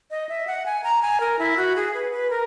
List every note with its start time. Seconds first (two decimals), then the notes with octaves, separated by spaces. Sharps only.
0.11 D#5
0.29 E5
0.47 F#5
0.66 G#5
0.84 A#5
1.02 G#5
1.20 A#4
1.39 E4
1.57 F#4
1.76 G#4
1.94 B4
2.12 B4
2.30 A#4